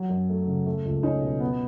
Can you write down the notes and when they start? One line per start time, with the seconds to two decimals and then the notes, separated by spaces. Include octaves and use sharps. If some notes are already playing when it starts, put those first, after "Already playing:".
Already playing: F#3
0.09 F#2
0.29 A3
0.47 C#3
0.66 A3
0.85 C#2
1.03 C#4 D#4
1.22 B2
1.40 B3